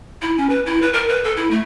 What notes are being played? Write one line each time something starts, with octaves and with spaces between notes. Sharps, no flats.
E4
C#4
B4
E4
B4
A#4
B4
A4
E4
A3